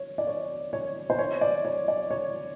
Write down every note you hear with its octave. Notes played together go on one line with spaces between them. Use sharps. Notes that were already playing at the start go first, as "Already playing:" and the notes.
Already playing: C#5
D5
C#5
C#5
C5
C#5
D5
C#5
D5
C#5